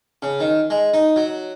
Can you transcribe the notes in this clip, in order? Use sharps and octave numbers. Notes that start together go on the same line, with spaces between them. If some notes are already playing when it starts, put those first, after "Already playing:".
C#3
D#3
G#3
D#4
F#3